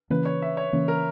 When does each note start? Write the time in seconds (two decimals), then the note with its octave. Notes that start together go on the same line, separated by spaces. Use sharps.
0.10 C#3 E3 A#3 C#4 B4
0.25 C#5
0.42 E5
0.57 C#5
0.73 C#3 E3 A#3 C#4
0.88 A#4